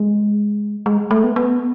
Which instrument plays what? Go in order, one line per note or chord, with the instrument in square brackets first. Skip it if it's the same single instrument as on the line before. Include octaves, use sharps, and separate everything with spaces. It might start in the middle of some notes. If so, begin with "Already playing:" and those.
Already playing: [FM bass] G#3
G#3
A3
B3
B3